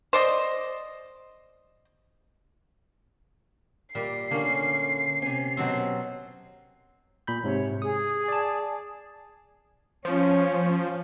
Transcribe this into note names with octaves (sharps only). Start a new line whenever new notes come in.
C5 D5 D#5
A#2 G3 C7
D3 A#3 C#4
C3 C#4 G#5
B2 F#3 C4
A#2 B5 G6
G#2 C3 C#5
G#4 D#6
D5 A5
F3 C#4